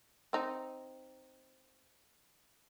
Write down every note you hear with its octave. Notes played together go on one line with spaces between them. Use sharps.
C4 D#4